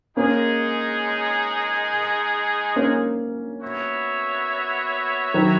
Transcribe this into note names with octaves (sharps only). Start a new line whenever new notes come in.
G#3 A#3 C#4 D#4 G#4
A#3 C#4
B3 F#4 C#5 E5
D#3 F#3